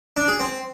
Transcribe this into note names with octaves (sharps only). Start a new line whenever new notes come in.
D4
G#4
C4